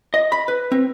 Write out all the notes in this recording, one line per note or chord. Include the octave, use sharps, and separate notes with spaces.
D#5
B5
B4
C4